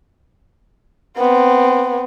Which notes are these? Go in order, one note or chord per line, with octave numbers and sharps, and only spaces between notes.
B3 C4